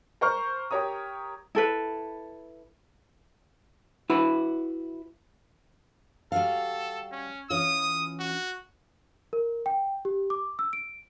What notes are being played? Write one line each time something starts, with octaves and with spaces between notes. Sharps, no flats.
A#4 C5 C#6 F6
G4 A#4 C#5 A#5 D#6
E4 A4 B4
E4 F#4 B4
G3 F#4 A4 F5
C#4
E3 C#4 F4 D#6
F#4
A#4
G5
G4
D6
E6
D7